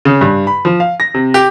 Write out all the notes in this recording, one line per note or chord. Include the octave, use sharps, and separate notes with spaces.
C#3
G2
B5
F3
F5
A#6
C3
G4